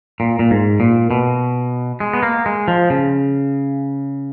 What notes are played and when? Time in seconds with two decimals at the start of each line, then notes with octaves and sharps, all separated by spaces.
0.20 A#2
0.39 A#2
0.51 G#2
0.80 A#2
1.11 B2
2.00 G#3
2.13 B3
2.23 A#3
2.46 G#3
2.68 F3
2.90 C#3